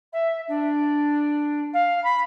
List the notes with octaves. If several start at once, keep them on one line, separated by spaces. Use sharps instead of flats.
E5
D4
F5
B5